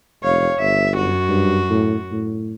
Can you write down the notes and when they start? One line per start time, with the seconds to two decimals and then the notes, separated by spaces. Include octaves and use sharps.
0.23 F1 C#5 F5
0.60 G1 E5
0.98 F#2 F#4
1.28 G2
1.70 A2
2.11 A2